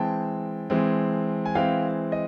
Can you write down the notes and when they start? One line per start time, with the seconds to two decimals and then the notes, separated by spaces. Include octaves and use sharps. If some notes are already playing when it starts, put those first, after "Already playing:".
Already playing: E3 G#3 C4 G5 A5
0.70 E3 G#3 C4
1.46 G#5
1.55 E3 G#3 C4 F5 G5
2.12 D#5